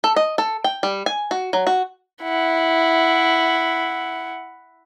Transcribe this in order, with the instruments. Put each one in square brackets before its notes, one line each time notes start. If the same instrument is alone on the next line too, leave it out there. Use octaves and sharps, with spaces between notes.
[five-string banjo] A4
D#5
A4
G5
G3
G#5
F#4
F#3
F#4
[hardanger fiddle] E4 F#5